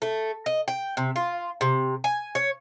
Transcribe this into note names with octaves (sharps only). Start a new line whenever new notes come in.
A3
D#5
G5
C3
F4
C3
G#5
C#5